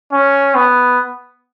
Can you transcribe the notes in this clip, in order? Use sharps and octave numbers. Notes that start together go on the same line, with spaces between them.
C#4
B3